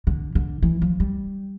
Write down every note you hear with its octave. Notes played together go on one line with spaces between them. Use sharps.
D3
D3
E3
F3
G3